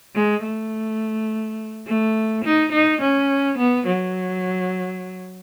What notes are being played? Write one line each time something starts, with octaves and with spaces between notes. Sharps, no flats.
G#3
A3
A3
D#4
D#4
C#4
B3
F#3